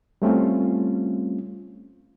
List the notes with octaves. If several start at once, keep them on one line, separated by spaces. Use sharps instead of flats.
G3 A3 C4 C#4 F4